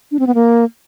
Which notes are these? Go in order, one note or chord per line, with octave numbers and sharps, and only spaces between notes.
D4
C4
B3
A#3